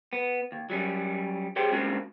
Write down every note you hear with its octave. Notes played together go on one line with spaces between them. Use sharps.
B3
D#2
F#3 G3 C#4
G4 G#4 C5 C#5 G5
G3 G#3 A#3 C4 C#4 F#4